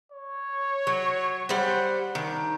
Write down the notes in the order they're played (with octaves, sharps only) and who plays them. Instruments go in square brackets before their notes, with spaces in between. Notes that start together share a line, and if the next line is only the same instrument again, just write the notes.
[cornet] C#5
[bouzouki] F#3
[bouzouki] G3 C5 [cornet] F#5
[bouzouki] D#3 [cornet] D4